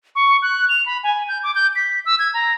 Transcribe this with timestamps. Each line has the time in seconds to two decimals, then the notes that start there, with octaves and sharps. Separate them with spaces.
0.15 C#6
0.42 F#6
0.69 F7
0.86 B5
1.03 G#5
1.28 G6
1.43 D6
1.55 G6
1.76 B6
2.06 E6
2.19 G#6
2.34 A#5